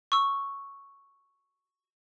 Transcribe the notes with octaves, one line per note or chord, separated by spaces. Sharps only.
C#6 E6